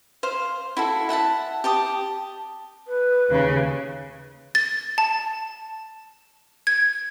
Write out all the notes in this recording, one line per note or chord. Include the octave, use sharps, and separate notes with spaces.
C5 F5
E4 F#4 A4
E5 F#5 G#5 A5
G4 A5 D6 D#6
B4
D#2 C#3
A6
A5
G#6